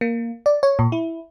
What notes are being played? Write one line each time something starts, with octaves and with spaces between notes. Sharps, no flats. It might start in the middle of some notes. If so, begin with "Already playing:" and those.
A#3
D5
C#5
A#2
E4